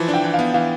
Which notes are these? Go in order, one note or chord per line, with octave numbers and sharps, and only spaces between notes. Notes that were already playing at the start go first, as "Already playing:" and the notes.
Already playing: E3 F3
D4
G5
E3
F5
B3
E3 F5